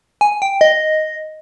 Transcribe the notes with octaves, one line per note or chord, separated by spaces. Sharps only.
G#5
G5
D#5